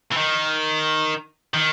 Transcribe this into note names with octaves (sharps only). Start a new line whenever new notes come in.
E3
D#3
D#3